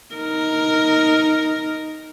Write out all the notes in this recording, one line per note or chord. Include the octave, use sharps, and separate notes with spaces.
D#4 A#4